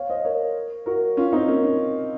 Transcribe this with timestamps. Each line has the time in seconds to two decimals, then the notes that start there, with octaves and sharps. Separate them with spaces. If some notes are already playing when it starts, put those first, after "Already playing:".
Already playing: C#5 F5
0.10 C5 D#5
0.25 A#4 C#5
0.86 F#4 A#4
1.17 C#4 F4
1.32 C4 D#4
1.48 A#3 C#4
1.63 C#4